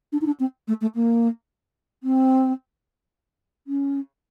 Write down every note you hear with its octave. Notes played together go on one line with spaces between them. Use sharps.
D4
D#4
D4
C4
A3
A3
A#3
C4
C#4